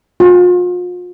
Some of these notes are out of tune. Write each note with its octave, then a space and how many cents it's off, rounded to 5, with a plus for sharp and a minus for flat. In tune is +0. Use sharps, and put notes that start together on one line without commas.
F4 +40